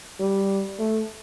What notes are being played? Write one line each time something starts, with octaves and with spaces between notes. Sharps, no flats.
G3
A3